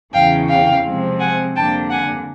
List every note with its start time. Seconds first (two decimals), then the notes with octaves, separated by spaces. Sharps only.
0.12 E2 C#3 E3 F5 G5
0.48 F5 G5
0.84 C3 F3 G#3 C4
1.19 F#5 G#5
1.55 F2 D3 G3 A#3 D4 G5 A5
1.90 F#5 G#5